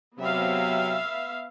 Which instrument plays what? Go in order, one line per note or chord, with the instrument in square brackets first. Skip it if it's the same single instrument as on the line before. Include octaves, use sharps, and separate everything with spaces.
[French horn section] C3 F#3 [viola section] B3 E5 F5